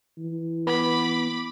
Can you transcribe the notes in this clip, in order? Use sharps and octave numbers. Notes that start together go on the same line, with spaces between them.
E3
B3 B5 D6